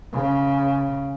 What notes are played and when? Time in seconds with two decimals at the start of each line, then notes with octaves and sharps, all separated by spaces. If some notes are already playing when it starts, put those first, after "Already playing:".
0.13 C#3